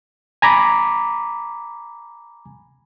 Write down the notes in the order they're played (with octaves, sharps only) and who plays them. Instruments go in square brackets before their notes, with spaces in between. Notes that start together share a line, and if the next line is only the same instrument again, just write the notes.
[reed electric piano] G#5 A#5 B5 D6